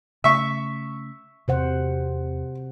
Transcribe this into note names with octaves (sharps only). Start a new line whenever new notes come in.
C#3 A3 E5 C#6
E2 C3 C5 F#5